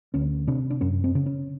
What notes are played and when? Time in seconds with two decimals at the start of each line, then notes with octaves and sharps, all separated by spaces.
0.14 D2 C#4
0.47 C3 D4
0.70 D4
0.81 F#2 C#4
1.04 C4
1.15 C#3
1.26 C#4